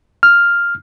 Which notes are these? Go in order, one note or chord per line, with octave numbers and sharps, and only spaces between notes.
F6